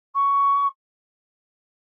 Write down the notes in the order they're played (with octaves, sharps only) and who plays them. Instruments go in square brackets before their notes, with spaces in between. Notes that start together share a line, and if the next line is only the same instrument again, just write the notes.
[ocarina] C#6